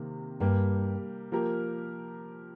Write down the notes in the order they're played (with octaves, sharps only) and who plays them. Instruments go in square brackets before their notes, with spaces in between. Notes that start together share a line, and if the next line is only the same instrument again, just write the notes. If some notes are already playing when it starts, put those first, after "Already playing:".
Already playing: [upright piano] C3 D#3 A#3
[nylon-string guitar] G2 [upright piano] G3 A#3 G4
[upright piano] F3 A#3 G4 A#4